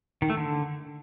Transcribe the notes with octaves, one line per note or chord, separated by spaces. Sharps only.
D#3
A3
D3